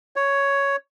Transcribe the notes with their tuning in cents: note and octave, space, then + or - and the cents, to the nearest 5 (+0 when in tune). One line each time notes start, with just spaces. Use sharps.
C#5 +5